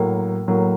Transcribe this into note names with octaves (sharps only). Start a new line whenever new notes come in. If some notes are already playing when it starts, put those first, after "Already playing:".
Already playing: A2 F#3 A#3
A2 F#3 A#3